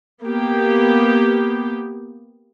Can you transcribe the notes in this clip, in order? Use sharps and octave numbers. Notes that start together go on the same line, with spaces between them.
A#3 B3 G4